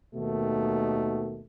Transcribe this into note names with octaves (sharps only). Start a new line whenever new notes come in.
D#2 B2 D#3 A3